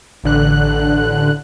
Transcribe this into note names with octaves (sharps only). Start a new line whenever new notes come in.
A1 D3 F#6